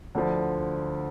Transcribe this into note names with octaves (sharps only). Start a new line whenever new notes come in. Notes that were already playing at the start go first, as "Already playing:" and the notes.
D2 D3 F3